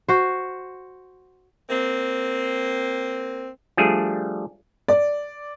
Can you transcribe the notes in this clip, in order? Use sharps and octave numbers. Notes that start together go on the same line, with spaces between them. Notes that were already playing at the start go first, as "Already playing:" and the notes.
F#4 C5
A#3 C4
F3 G3 A3 D4 G#4
D5